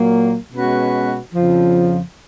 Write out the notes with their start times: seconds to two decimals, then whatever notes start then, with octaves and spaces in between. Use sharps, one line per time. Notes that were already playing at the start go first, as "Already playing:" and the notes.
Already playing: A#2 F#3 A#3
0.52 B2 G#3 C#4 F#4 B4
1.34 F2 C#3 F3